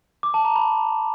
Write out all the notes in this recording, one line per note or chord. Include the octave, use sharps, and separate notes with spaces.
D6
A5
A#5
B5